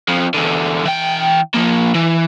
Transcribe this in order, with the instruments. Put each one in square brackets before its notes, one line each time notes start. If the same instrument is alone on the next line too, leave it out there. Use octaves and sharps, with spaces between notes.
[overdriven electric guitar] F2 F3
E2 D3
E3 G5
F3 A#3
E3